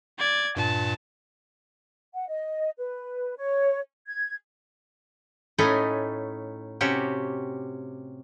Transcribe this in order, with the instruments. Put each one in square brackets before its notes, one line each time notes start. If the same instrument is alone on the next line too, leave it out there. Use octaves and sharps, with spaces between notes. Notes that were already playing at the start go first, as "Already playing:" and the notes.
[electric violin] D5 G#6
[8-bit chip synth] G2 A#2 [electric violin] A5
[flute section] F#5
D#5
B4
C#5
G#6
[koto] A2 A3 C#4 D#4 D#5 G#5
C3 C#4 F#4 G4